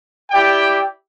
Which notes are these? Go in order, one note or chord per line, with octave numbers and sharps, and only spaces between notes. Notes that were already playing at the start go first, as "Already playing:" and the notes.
E4 G4 D5 G5